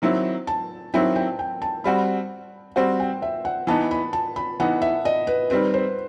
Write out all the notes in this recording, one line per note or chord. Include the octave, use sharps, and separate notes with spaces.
D#3 F#3 C4 E4
A5
D#3 F#3 C4 E4 G5
G5
G5
A5
G3 C4 F#4 B5
G3 C4 F#4 C5
G5
E5
F#5
E3 B3 D#4 A5
B5
A5
B5
E3 B3 D#4 F#5
E5
D#5
B4
D#3 G3 C4 B4
C5